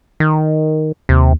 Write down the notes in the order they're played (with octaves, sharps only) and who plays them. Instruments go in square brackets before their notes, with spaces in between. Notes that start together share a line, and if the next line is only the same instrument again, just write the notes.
[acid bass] D#3
[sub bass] D#2 [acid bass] C3